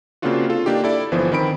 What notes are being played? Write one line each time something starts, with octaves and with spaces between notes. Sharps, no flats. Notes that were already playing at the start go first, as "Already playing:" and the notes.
C#3 A#3 C4 D4 F4 F#4
F4 A4
A#3 D4 D#4 G4
E4 A4 D5
G1 E3 F3 B3 C5
D#3 C4 B5 D7